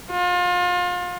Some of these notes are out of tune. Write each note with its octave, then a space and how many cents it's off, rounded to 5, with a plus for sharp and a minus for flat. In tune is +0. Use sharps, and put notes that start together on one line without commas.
F4 +30